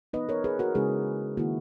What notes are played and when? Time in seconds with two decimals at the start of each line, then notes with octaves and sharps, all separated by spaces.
0.13 E3 B3 D#4 B4 D#5
0.29 A#4 C#5
0.44 G#4 B4
0.59 F#4 A#4
0.75 C#3 G#3 C#4 E4 G#4
1.37 D#3 A#3 E4 F#4